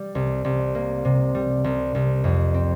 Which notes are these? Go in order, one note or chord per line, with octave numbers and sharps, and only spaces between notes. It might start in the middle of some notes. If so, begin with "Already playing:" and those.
Already playing: G3
C2
C2
A#3
C3
G3
C2
C2
F2
C4